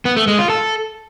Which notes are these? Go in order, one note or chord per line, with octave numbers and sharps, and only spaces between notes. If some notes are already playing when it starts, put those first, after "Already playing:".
B3
A3
G#3
F4
A4